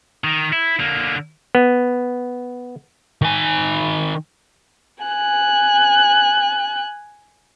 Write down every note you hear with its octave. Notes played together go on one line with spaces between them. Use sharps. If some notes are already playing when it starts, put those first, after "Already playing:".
D#3
E4
D3 A#3
B3
D#3 G#5
G#5 F#6